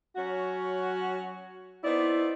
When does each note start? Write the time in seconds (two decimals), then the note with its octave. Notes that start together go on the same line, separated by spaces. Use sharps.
0.16 F#3 C#4 F#4
1.84 B3 C4 D#4 E4 D5